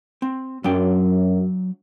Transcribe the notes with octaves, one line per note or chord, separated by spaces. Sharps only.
C4
F#2 F#3 D4 G5